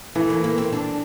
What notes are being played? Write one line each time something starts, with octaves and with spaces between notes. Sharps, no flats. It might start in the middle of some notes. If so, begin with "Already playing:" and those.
E3 A3
A#3
A#3
C4
D4